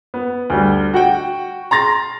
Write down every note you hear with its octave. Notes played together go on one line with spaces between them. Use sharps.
B3
D2 G3
F#4 F#5 G5
A#5 C6 A6 A#6